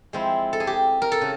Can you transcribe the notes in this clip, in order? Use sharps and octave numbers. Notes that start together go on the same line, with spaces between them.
F3 G#3 C4 E4
A4
G#4
G4
A#4
A4
C#3